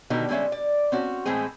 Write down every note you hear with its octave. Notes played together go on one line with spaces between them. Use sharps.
B2 D3 D#3 D#4 G4
D3 G3 G#3 C#4 E5
D5
C4 C#4 F#4
A2 E3 G#3 C4 G#4